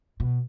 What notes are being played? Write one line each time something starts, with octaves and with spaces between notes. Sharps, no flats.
B2